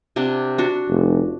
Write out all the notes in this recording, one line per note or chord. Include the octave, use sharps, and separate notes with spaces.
C3 D4 F#5
D4 F#4
F1